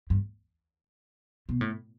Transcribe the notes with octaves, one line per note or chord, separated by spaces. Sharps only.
G2
B2
A2